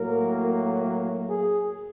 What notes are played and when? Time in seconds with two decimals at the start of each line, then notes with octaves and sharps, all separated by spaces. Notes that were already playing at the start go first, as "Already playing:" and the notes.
Already playing: A2 F#3 A#3 A#4
1.30 G#4